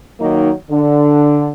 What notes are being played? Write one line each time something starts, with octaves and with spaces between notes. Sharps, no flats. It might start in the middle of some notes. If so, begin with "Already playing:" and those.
D#3 F#3 A#3 D#4
D3